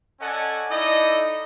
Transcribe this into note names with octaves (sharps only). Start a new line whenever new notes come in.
C#4 A4 D5 D#5 F#5 G#5
D#4 E4 A4 D5 D#5